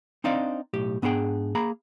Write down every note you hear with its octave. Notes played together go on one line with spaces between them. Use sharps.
C4 D4 D#4 C5 D5 F5
B1 A2 G4
G#2 B3 D4 F4 G#4 G5
A#3 G#4 A#5 B5